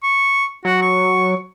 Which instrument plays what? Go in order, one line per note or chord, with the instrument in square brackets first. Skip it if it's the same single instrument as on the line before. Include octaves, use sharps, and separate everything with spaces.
[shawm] C#6
[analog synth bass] F#3 [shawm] F#4
[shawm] C#6